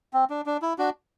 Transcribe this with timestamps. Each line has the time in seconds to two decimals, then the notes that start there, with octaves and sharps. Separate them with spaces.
0.13 C4
0.30 D4
0.46 D4
0.62 E4
0.78 D4 F#4